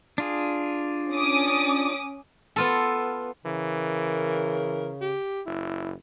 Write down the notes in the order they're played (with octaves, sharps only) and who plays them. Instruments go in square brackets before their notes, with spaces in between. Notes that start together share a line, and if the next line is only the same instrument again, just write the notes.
[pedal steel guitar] D4 F4 G#4
[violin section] C#4 D6 D#6
[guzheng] B3 F4 A4
[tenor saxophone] C#3 [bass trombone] E3 [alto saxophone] A#4
[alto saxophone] G4
[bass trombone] F#1 [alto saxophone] E4